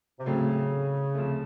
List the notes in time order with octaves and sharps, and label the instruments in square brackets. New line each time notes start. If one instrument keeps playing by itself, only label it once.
[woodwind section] C3
[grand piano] A2 F#3 A3 C4 [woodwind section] C#3
[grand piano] C3 F3 A3